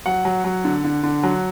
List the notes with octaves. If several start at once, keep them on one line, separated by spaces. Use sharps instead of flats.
F#3 F#5
F#3
F#3
D3
D3
D3
F#3